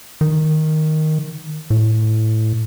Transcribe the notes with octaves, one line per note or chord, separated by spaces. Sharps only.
D#3
A2